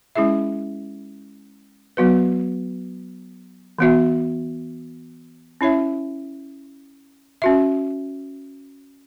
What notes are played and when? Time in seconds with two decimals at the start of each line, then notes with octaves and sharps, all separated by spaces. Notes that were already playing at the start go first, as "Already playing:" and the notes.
0.15 G#3 C#4 E4 G#4 E5
1.97 F#3 B3 F#4 B4
3.78 E3 B3 F#4 E5
5.61 C#4 E4 C#5 E5
7.42 C#4 F#4 E5